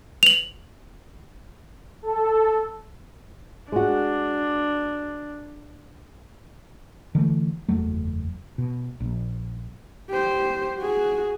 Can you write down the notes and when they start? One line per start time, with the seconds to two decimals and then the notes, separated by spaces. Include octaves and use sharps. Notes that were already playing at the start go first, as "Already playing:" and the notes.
0.23 F7 F#7
2.02 A4
3.72 G#3 D4 F#4
7.15 D3 E3 A3
7.69 F#1 E2 F#3 A3
8.58 B2
9.00 A#1
10.09 G4 C5
10.80 F#4 G#4